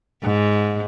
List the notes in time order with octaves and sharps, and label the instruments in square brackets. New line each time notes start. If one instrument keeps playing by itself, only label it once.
[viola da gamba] G#2